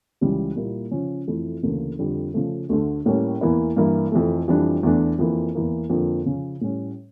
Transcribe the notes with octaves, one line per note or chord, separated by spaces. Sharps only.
C#2 C#3 E3 G3
A#2 G3 A#3 E4
C#3 F3 C#4
F2 E3 A3 E4
D2 C#3 E3 A#3
F2 D3 G3
C#3 F3 A3
D2 D3 A3
A2 G3 A#3 C#4
E2 E3 A#3 E4
G2 E3 A#3 E4
F2 E3 A3
F2 E3 G3 D4
E2 E3 A3 D4
F2 E3 A#3
E2 E3 A#3
F2 D3 F3 A#3
C#3 F3 C#4
A2 G3 C#4